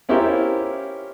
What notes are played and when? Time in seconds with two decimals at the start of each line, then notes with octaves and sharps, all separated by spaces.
0.09 C#4 E4 F4 G4 A#4 C5